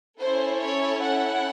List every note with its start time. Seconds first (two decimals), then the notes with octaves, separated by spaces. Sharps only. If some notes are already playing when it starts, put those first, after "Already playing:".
0.21 C#4 E4 A4 C5
0.62 C#5
1.02 F#5